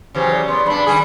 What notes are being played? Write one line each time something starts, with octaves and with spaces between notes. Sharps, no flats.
C#3 E3 F#3 G4 C5
D5
B3 D5 C6
G2 D4 B5
D#3 G3 G#4